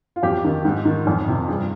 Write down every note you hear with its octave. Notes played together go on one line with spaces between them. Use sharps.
F4
F2 G4
D#3
G#2
D#3
F2
C3 F3
G2 G#4